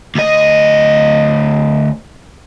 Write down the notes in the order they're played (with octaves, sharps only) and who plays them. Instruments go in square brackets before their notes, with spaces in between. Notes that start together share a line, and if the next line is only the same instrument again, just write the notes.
[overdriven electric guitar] D2 D#5